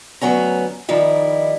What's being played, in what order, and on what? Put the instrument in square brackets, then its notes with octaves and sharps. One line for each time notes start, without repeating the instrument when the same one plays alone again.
[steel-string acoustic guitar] D2 F#3 B3 C#4 A#5
D#3 F3 G3 D#4 E4